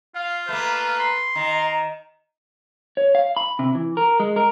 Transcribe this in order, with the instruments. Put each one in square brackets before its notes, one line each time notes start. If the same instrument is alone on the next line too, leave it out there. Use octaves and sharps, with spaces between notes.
[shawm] F4 [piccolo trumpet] F5
[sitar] A3 A#3 [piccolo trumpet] B4
[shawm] C6
[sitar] D#3 [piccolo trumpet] A#5
[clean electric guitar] C#5
F5
B5
C3
E3
A#4
G#3
A#4